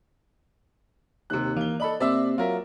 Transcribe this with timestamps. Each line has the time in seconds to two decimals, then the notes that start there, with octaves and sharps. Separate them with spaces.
1.30 D#2 C3 F#6
1.56 E3 A#3 G7
1.80 A4 D5 D#5 B5 F#7
2.00 C3 A#3 C4 C5 D5 E5 E6
2.38 F#3 F4 A#4 E5